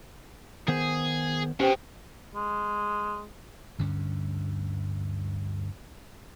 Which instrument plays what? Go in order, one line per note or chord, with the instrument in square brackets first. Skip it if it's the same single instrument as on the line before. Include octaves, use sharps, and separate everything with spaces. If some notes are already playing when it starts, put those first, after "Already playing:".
[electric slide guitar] D#3 B3 C5 [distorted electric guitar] G#4
[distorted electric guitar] B2 [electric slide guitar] C#4 [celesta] G4 C5 G5
[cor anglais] G#3
[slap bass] D2 G2 D3 C#4